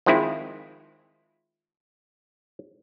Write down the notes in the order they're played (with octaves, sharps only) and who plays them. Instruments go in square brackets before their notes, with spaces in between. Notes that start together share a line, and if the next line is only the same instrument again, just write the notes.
[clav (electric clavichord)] D#3 F3 G#3 C4 E4